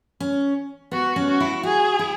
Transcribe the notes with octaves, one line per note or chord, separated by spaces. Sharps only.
C#4
B3 F#4
C#4
F#4
E4
F#4 G#4
E4